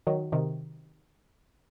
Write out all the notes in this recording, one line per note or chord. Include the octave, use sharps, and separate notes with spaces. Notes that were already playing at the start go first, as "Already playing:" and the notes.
D#3 F#3
C3 D#3